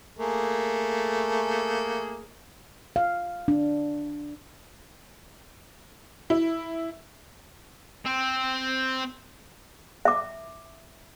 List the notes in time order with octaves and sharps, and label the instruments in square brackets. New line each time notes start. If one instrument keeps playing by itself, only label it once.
[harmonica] A3 A#3 G#4
[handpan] F5
D4
[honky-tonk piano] E4
[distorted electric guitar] C4
[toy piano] E5 D6